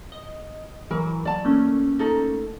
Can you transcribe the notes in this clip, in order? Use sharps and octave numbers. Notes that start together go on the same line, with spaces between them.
D#5
E3 F#3 A#4
D5 A5
A3 A#3 C#4
D#4 A4 A#4